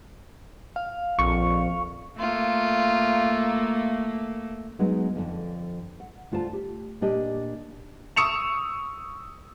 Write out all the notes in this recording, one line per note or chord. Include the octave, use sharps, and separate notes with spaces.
F5
A#1 F2 C#6
A3 A#3 F4
F#3 G#3 B3 D#4
F2 A2 D3 F3
F#5
D2 F4 C5 A5
G4
A#2 D4 G4 D#5
C#6 D#6 E6 C#7 E7 F7